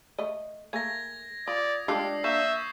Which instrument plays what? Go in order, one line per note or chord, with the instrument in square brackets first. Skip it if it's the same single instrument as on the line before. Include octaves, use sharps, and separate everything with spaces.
[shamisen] A3 D#5
[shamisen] A3 A#3 G#4 [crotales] G#6 A#6
[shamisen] F4 [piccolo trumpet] D5 [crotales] D#6
[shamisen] G#3 A3 F4 [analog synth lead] D4 [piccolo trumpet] G4 [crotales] E6 C7
[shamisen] A#3 [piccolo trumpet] E5 [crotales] C#6 G6 E7